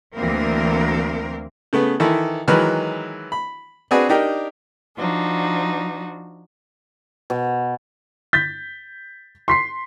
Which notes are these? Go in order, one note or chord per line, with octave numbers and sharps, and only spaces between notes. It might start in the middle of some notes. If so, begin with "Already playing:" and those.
D2 E3 A#3 C4 A#4
C#3 A3 B3
D#3 E3 E4 A4
D#3 E3 F#3 G#3 B4 F6
B5
C4 D4 F#4 G#4 B4 G#5
D4 D#4 G4 A#4
F3 D4 D#4 F#4
B2
G6 A6 B6
C6 B6 C7